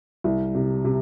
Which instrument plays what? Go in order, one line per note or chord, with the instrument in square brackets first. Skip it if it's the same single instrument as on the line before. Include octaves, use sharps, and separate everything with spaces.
[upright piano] C2
C3
C3